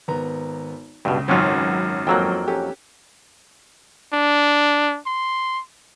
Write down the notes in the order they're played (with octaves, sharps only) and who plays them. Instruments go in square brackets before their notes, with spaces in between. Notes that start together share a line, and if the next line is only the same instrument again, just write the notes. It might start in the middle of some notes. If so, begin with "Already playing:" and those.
[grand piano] G#1 B3 A#5
[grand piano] C#2 [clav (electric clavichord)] G2 B2
[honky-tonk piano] G#1 F#2 [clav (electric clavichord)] C4 C#4 F4
[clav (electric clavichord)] F2 F#3 A#3 [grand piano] G5 E6 F#6
[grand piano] C#4 G4 A4
[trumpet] D4
C6